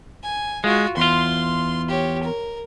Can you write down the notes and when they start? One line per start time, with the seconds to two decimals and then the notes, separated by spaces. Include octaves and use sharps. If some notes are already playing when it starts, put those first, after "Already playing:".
0.23 G#5
0.64 G#3 F4 F#4
0.97 E2 F4 C6
1.88 G4 C#5
2.23 A#4